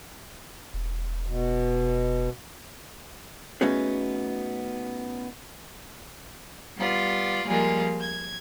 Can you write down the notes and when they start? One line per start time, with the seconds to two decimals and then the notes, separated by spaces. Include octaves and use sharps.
0.74 E1
1.26 B2
3.61 A3 B3 C#4 D#4 F#4 G#4
6.77 G3 B3 F4 D5
7.46 F3 G3 G#3 A#3 F4 A#4
7.99 G#6